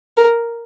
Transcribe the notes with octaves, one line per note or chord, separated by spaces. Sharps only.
A#4